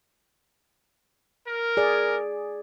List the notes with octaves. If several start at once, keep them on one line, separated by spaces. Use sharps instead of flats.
A#4
G#4 D5